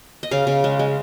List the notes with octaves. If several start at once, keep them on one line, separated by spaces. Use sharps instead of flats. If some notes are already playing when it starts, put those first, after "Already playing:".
D#5
C#3 F5
C#3
G#3
G#3